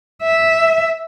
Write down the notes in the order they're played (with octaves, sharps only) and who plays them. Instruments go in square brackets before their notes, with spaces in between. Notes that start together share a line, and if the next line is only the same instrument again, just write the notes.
[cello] E5